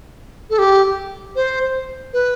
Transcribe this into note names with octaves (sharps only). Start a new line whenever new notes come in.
A4
G4
C5
B4